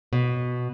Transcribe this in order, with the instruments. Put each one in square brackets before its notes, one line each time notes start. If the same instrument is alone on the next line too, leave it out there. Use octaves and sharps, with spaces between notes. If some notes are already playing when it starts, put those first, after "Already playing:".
[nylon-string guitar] B2